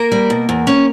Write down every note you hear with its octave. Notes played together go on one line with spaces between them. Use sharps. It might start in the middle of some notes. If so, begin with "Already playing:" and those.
Already playing: A#3 A#4
G3
B2
E2
C#4